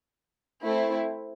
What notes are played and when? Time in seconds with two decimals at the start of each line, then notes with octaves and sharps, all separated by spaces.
0.64 A3 C4 E4